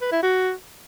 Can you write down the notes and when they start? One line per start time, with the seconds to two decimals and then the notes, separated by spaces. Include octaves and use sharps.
0.02 B4
0.12 E4
0.23 F#4